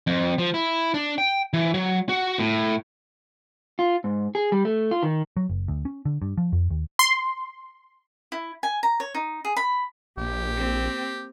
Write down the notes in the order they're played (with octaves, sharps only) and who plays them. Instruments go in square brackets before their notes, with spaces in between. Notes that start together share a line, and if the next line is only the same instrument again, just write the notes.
[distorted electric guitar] F2
F3
E4
D4
G5
E3
F#3
F#4
A2
[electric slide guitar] F4
G#2
G#4
G3
A3
F4
D#3
[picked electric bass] F#3
F#1
D2
C#4
D3
G2
F3
F2
D#2
[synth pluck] C6
[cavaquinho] E4
G#5
A#5
C#5
D#4
G#4
B5
[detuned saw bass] A#1 [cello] A#2 [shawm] G4
[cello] A#3 C4